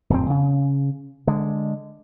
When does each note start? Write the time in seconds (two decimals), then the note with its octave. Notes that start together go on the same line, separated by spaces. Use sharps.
0.10 D1 F2 C4
0.30 C#3
1.27 D3 G#3